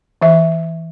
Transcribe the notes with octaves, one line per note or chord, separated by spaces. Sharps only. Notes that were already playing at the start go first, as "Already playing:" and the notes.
E3 E5